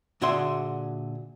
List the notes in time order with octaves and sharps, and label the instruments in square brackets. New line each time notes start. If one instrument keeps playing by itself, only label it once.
[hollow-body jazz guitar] A#2 D3 F#4 G#4 E5 C6